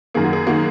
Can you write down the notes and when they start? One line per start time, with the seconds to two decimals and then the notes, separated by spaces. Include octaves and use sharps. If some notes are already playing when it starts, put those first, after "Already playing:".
0.14 F#2 D#3 A#3 G#4
0.24 F#4
0.33 G#4
0.47 D#3 A#3 F#4